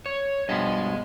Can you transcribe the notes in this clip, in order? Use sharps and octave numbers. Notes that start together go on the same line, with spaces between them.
C#5
G2 B2 F3 G#4 D#5